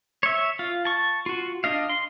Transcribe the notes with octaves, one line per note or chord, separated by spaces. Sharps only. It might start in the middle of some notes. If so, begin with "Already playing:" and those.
C#5 E5
F4
A5 C#6
F4 F#4
D4 D#5 F5
C6